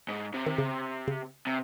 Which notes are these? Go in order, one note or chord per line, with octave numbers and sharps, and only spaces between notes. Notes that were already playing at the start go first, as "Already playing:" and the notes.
G#2
C3
D#3
C#3
C#3
C3